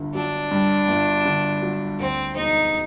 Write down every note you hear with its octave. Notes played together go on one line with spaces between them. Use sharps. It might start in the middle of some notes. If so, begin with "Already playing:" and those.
Already playing: G1 G2 D3
F#3 D4
G2
G1
D3
F#3
D2 C4
E1 D#4